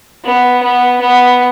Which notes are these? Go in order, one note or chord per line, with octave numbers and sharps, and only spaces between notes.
B3
B3
B3